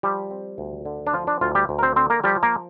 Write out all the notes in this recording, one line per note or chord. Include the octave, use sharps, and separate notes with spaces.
F3 G3 G4
C4
D2
D3
D4
F3 F4
D4
D2 F4
G3 G4
D2
A#4
C4 C5
D3 C4 C5
A#3 A#4
F3 G3 G4
A#3 A#4